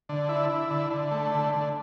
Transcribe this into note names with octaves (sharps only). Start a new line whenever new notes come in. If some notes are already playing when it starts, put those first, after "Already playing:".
D3
E4
E4
D3
D3
A3
D3
D3